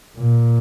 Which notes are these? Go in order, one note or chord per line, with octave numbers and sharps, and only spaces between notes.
A#2